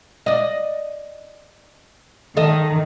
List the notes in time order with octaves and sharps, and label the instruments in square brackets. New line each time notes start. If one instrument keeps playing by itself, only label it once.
[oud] D5 D#5
[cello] D#3 [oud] A4 D#5